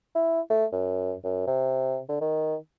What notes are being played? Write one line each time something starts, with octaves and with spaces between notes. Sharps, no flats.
E4
A3
F#2
F#2
C3
D3
D#3